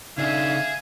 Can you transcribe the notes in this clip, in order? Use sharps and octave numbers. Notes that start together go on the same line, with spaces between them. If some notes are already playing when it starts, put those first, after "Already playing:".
C#3 D4 D#4 G#4 E5 F5